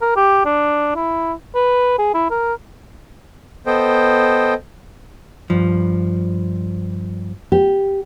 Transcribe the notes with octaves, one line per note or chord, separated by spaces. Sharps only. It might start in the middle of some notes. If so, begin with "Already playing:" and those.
A#4
G4
D4
E4
B4
G#4
E4
A#4
B3 A4 C5 D#5 G5
G2 F3
G4